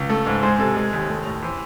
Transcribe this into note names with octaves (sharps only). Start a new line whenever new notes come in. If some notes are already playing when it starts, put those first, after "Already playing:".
Already playing: C#2
A3
G#2
G#3 C5
C3 A4
G#3
D#2
A3
A2
E3 C5